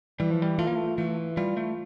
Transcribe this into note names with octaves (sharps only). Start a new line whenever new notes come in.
E3 G3
F3
G3
A3 F4
A#3
A3
E3 A3
G3 F4
A3